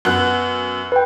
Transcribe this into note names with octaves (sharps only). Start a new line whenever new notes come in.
F#2 B3 F#6
B4 G5